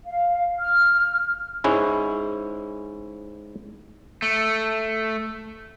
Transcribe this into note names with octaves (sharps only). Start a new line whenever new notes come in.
F5
F6
G#2 G#3 C#4 E4
A3